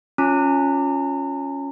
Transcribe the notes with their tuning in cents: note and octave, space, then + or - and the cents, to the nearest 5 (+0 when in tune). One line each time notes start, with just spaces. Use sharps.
C#4 +0 F4 +20 A#5 -40